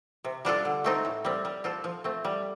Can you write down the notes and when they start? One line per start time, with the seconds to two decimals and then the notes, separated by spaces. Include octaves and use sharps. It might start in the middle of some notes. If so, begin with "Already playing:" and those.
0.25 C3
0.45 G3 D4 F4 A4
0.65 D3
0.84 A3 C4 D#4
1.05 A2
1.25 G3 C4
1.45 G3
1.64 C4 F4 A4
1.84 F3
2.04 A3 C4
2.25 G3